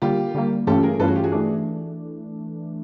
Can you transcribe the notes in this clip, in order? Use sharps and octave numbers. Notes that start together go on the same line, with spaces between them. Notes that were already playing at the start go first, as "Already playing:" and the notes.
D3 G3 A#3 F4 G4
D3 G3 A#3
G2 E3 A3 C#4 F4 G4 A4
G#4 A#4
G2 E3 A3 C#4 F4 A4 B4
F#4 G#4
F4 G4
F#4 G#4
E3 A3 D4